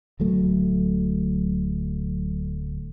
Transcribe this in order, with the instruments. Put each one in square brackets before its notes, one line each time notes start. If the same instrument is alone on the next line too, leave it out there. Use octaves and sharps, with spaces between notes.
[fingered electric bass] D1 F#3 A3